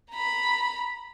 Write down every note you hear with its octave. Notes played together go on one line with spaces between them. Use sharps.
A#5 B5